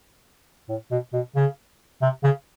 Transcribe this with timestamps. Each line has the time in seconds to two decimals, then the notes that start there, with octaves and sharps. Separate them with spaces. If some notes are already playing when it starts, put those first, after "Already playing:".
0.69 A2
0.91 B2
1.13 B2
1.36 C#3
2.02 C3
2.24 C#3